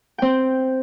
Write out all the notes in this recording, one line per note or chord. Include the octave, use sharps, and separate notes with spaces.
C4 G5